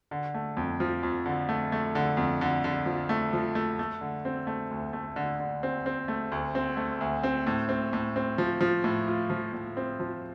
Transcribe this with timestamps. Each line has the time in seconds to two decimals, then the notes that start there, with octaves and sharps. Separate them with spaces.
0.11 D3
0.34 A3
0.57 F2
0.80 F3
1.03 F2
1.26 D3
1.49 A3
1.72 A3
1.95 D3
2.17 F2
2.41 D3
2.64 D3
2.86 F3
3.09 A3
3.33 F3
3.55 A3
3.79 A3
4.01 D3
4.25 C4
4.47 A3
4.71 D2
4.93 A3
5.16 D3
5.40 D3
5.63 C4
5.86 C4
6.08 A3
6.32 D2
6.55 C4
6.77 A3
7.01 D2
7.23 C4
7.47 A2
7.69 C4
7.93 A2
8.16 C4
8.38 F3
8.61 F3
8.84 A2
9.08 F4
9.30 F3
9.53 A2
9.77 C4
10.00 F3